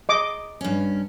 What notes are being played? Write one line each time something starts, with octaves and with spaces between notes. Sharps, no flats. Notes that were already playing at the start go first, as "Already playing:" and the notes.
D#5 D6
G2 C#4